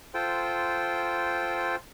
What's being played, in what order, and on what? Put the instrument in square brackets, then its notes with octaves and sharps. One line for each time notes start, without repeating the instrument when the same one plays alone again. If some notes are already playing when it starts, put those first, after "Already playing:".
[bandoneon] F4 A4 C5 G5